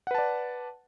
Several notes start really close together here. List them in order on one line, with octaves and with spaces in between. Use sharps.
F#5 B4 A5 D5